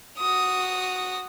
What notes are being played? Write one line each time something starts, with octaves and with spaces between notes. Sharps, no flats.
F#4 D#6